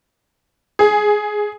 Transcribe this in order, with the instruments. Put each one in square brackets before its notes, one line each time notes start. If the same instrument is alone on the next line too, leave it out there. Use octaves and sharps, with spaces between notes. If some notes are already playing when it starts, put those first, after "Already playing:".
[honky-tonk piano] G#4